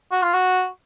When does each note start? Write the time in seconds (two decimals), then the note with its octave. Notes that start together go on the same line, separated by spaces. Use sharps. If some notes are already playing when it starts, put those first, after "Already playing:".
0.12 F#4
0.23 F4
0.34 F#4